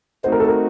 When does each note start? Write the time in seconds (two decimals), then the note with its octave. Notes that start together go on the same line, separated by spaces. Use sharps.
0.24 A3 C4 D#4 F#4 C5
0.32 A#4
0.40 A4
0.48 A#4